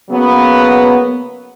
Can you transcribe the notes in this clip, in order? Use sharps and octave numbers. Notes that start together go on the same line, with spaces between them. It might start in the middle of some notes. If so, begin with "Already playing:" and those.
C#3 F#3 A#3 B3